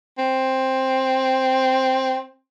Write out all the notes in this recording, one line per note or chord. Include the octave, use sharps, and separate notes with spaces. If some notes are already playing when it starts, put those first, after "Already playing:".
C4